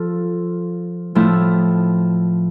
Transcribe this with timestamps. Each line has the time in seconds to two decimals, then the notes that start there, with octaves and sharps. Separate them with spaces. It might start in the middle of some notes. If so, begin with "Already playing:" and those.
Already playing: F3 F4 A4
1.15 A2 F3 A3 E4